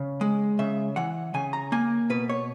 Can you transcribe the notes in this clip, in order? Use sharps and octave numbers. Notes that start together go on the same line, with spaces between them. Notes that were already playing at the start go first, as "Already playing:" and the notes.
Already playing: C#3
G#3
C#3 E5
E3 F#5
C#3 G#5
A#5
A#3 G#5
B2 B4
C#5